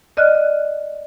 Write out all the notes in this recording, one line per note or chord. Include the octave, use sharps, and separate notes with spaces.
D5 D#5 F6 F#6